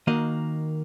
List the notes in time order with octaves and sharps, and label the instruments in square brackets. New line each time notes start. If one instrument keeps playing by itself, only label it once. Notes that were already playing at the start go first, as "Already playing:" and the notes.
[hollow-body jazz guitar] D#3 A#3 F#4 D#5